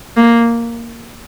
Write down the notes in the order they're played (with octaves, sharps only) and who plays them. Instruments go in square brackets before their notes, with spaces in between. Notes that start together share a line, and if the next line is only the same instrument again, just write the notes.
[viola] A#3